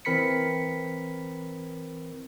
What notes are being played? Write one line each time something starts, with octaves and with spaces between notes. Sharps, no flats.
E3 C4 A#4 B5 B6 C#7